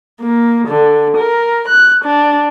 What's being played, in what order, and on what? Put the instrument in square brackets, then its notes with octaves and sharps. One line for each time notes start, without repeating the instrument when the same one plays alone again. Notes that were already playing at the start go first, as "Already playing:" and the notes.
[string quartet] A#3
D3
A#4
F#6
D4